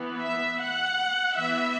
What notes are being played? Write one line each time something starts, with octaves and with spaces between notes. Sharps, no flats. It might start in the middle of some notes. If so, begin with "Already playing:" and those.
Already playing: E3 B3
E5
F#5
E3 B3 E5